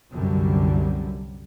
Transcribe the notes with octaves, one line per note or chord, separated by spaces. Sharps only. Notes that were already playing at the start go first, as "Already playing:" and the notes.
C2 F#2 D3 G3